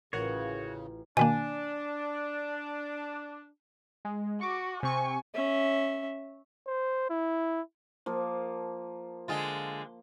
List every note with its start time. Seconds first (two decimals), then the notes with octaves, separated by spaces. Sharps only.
0.13 A1 C#3 F4 F#4 A#4 C#5 G6
1.17 B2 D#3 A#3 D4 G#5
4.05 G#3
4.41 F#4 C#6 D6
4.83 C3 C4 G#5 C#6
5.34 C#4 E5
6.67 C5
7.10 E4
8.06 F3 A#3 A#4
9.28 D3 G#3 F4